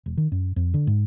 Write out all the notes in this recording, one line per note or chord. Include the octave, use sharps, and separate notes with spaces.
E1
D#3
F#2
F2
D3
G#2